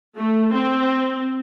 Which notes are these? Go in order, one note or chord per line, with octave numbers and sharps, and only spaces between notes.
A3
C4